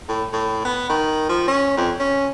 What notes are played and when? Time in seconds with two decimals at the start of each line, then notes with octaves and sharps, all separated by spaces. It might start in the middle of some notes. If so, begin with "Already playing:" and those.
0.09 A2
0.33 A2
0.65 B3
0.89 D#3
1.29 F3
1.48 C#4
1.77 F2
2.00 C#4